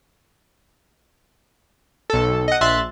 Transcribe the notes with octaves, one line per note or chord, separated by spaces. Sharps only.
B1 A4
D#5 F#5
A#1 E5 C6 F#6 A6